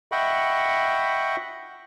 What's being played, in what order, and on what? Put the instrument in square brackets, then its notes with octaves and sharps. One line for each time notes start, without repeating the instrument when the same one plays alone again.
[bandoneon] D#5 E5 F#5 G5 B5 C#6